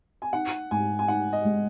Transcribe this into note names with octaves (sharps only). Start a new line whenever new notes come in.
G#5
D#4 F#5
G#2 G#5
G#5
D#4 F#5
D#5
G#3